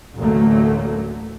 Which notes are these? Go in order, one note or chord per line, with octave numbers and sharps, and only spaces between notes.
A1 D2 F#3 A3 A#3